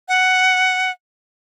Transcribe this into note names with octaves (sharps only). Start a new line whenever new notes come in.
F#5